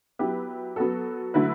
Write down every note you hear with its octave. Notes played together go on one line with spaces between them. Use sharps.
F#3 B3 E4 G4 B4
F#3 B3 F#4 A4
D3 F#3 A3 E4 B4